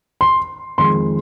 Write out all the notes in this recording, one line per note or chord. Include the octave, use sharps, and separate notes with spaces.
C6
F2 D#3 G#3 C6